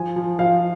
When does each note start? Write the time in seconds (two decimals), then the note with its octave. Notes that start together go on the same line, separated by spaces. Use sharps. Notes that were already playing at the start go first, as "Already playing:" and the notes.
Already playing: F3 G#5
0.16 F3
0.39 F3 F5